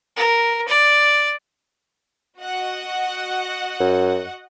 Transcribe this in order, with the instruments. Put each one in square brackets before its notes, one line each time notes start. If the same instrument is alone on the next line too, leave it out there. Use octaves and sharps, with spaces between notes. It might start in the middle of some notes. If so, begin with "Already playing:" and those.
[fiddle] A#4
D5
[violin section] F#4 D#5 F#5
[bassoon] F#2